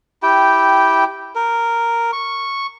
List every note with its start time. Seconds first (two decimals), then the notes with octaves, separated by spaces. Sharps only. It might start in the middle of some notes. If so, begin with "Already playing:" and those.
0.23 E4 G4 G5
1.36 A#4
2.13 C#6